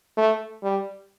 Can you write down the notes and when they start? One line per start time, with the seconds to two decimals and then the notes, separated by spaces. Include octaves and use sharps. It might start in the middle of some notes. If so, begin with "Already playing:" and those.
0.17 A3
0.63 G3